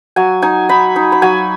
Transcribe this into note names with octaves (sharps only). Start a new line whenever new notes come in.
F#3 G#5
D#4 G#5
D#4 B5
D#4
B5
F#3 G#5